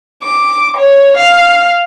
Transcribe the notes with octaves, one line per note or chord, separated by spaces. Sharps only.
D6
C#5
F5